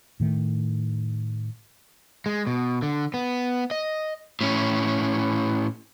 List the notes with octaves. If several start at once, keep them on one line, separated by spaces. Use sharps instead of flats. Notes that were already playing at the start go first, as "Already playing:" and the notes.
A2 D#3 A3
G#3
B2
D3
B3
D#5
A2 C#4